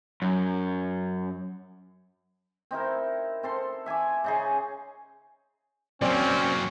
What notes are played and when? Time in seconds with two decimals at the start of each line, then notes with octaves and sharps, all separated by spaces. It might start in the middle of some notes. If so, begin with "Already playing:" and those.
0.22 F#2
2.71 C4 D#4 E4 A#4
3.43 C4 A4 C6
3.86 E5 G#5 C6 D6
4.24 C#3 D#4 G#4
6.02 F#3 A#3 C4 C#4 D5